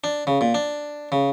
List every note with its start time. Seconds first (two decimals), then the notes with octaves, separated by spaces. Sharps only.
0.04 D4
0.27 C#3
0.41 A#2
0.54 D4
1.12 C#3